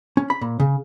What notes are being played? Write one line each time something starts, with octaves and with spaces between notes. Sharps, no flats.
C#4
B5
A#2
C#3